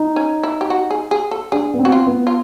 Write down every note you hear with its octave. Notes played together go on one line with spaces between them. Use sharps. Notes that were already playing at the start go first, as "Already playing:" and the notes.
Already playing: D#4
C#4
E4
G4
F#4
G#4
G#4
A4
D4 G#4
B3
C4
F#4
F4
B3
F4